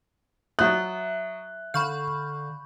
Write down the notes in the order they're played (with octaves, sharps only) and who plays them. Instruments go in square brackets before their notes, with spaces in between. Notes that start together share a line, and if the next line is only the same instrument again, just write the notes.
[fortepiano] F#3 D#6 [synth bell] E5 [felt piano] F#6
[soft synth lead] D3 [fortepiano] F5 [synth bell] B5 C#6 G6